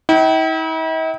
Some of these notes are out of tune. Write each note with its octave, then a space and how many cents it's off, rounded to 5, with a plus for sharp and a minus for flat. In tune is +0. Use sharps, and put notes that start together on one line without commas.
E4 -45 G5 -35